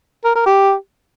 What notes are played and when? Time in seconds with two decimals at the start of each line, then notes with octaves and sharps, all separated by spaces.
0.25 A#4
0.35 A#4
0.46 G4